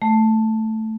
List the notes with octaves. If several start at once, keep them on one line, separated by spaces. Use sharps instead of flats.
A3